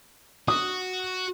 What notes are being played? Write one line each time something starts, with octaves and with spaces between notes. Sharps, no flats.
F#4 D#6